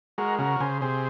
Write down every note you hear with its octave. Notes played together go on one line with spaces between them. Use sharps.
G#3 F#4 A#4
C#3 F#4 A#4
C#3 G#4 C5
C3 G#4 C5